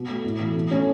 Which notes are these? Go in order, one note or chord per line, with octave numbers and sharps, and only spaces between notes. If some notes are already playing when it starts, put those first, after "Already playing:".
Already playing: B2
A3
A2
E3 A3
B2
A3 C#4